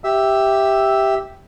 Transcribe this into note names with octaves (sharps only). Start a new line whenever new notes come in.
G4 E5 E6